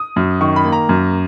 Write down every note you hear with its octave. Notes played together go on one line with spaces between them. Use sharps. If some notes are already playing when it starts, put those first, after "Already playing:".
Already playing: D#6
F#2
D#3 C#6
B5
A#3
A#5
F#2